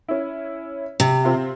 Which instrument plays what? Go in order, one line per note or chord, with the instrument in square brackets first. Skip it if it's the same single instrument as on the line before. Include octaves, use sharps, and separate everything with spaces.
[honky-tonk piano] C#4 E4
[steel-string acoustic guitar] C3
[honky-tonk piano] C4 F4 E5